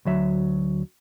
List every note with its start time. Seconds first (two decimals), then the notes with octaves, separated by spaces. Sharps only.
0.05 D2 F#3 E5